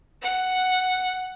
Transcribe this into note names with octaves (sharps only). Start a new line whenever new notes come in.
F#5